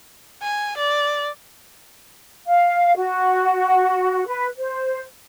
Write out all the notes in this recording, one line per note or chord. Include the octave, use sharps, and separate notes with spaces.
G#5
D5
F5
F#4
B4
C5